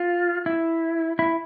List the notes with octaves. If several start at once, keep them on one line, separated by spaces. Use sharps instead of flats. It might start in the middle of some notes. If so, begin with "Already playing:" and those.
Already playing: F4
E4
E4